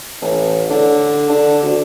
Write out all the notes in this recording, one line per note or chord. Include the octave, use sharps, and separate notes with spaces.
A1
D3
D3
D2